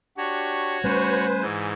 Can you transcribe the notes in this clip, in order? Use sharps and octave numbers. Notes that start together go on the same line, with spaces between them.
D4 F#4 G4 C#5
G3 A3 C#4 B4 C5 G#5
G#2 E3